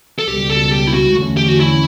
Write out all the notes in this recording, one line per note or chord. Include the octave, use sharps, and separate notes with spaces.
A4
C#2 B2 G3 G4
A4
G4
E4
F#4
E2 D3 A3 C#4
G4
F#4
E4